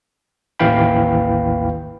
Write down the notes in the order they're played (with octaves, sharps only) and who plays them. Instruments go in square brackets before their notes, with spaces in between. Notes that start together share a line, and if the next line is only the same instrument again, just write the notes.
[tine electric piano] A1 D#2 E3 F5 G5 B5